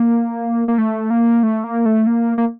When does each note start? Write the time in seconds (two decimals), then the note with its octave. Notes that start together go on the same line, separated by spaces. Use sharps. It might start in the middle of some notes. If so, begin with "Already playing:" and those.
Already playing: A#3
0.68 A#3
0.78 A3
1.10 A#3
1.43 A3
1.64 A#3
1.86 A3
2.07 A#3
2.38 A#3